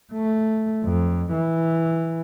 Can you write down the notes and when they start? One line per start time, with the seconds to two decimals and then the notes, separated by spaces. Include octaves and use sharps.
0.13 A3
0.85 F2
1.32 E3